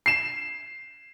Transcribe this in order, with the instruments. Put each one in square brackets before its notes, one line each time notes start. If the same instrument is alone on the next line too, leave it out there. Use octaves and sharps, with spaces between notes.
[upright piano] C7 E7